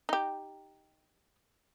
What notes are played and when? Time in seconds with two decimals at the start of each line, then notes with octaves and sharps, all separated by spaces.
0.09 D#4 G4